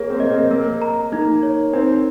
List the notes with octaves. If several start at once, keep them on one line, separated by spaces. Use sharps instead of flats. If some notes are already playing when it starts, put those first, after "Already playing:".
Already playing: A#3 G#4 C#5
C4
A#3 D#5
C4
A#3 A#4
A#5
A#3 D#4
C#5
C4 D#4